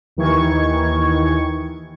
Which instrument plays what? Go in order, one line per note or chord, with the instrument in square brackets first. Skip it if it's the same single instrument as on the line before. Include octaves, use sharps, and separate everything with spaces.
[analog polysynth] D#2 D#3 E3 C#6 G#6